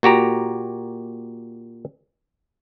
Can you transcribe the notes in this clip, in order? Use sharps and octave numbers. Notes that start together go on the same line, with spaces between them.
A#2 F#4 G4 A#5